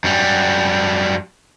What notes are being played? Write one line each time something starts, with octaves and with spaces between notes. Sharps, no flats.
F#2 G3